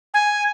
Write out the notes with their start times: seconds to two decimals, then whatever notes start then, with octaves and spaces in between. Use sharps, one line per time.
0.14 G#5